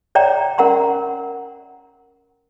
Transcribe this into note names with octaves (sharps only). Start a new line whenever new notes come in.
C#5 D5 G5 A#5
C#4 A#4 F#5 A#5 C6